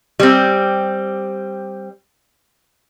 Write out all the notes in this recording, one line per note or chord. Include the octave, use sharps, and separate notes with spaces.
G3 C4